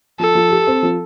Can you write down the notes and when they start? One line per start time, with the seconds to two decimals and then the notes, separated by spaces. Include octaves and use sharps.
0.19 F3 A4
0.35 F3
0.50 G4
0.67 C4
0.83 F3